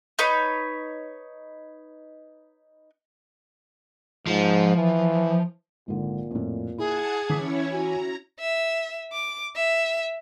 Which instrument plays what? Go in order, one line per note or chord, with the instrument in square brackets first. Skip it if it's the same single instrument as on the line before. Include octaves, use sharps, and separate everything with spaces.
[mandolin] D#4 B4 C#5 B5
[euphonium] G#2 [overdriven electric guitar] F3
[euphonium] E3
[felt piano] G#1 D3 [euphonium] A#2
[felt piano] F2 A2
[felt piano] E4 [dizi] G#4 [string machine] F#5 A5 G#6
[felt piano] E3 D6 B6 [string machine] C#4 E4 C#5
[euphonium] F#4 [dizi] G#5 [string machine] A#5
[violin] E5
D6
E5